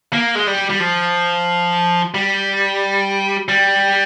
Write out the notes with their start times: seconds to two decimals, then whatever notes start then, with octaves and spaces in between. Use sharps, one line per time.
0.13 A#3
0.35 G#3
0.47 G3
0.70 G3
0.80 F3
2.15 G3
3.49 G3